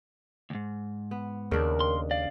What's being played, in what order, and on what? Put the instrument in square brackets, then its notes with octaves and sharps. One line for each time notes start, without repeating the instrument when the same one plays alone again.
[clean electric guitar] D2 G#2
[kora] B3
[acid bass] D#2 [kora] C#3 D4 [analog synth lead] A#4
[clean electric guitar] C6
[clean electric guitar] D5 [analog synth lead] F5